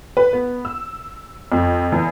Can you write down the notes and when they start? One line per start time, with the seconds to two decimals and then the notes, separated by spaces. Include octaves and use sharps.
0.17 B4
0.33 B3
0.65 E6
1.52 F2
1.92 E2